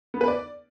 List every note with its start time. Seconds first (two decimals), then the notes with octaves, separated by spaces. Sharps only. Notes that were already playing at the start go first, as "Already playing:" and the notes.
0.14 B3
0.21 B4
0.28 D5